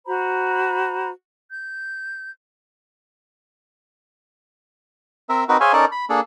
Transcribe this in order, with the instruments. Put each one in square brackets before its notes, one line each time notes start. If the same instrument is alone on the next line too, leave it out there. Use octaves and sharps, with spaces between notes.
[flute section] F#4 C5 A#5 B5
G6
[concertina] C4 A#4 E5
C4 D#4 F#4 A#4 B4
G#4 C5 C#5 E5 F5 G#5
C#4 D#4 A4 A#4 D5 A5
B5
A#3 D4 G#4 A4